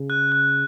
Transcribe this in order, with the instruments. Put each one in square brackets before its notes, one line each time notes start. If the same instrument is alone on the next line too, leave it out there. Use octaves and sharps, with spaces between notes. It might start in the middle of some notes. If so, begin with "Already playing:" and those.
Already playing: [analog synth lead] C#3
[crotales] F#6
F#6